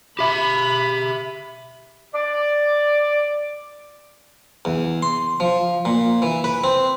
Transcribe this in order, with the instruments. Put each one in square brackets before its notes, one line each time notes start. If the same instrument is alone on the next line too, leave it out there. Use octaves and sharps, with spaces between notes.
[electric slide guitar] G4 E5 [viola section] B5
[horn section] D5
[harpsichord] E2
C6
F3
A#2
E3
B4
C4